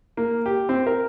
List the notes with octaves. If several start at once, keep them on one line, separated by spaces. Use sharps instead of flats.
A#3
G4
C4
A#4